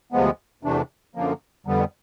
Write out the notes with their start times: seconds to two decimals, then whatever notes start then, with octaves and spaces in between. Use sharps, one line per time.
0.12 D2 C3 F3 G#3 B3
0.63 E2 C3 E3 A3 D4
1.15 F#2 D3 F3 A#3
1.66 F2 D3 G3 B3